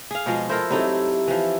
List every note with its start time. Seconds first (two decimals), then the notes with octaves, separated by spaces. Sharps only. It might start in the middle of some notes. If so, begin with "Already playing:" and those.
0.11 G#4 F5
0.26 B2 F3 G#3
0.49 E4 A4 A#4 C5
0.70 C3 F#3 D#4 E4 A4
1.28 E3 F3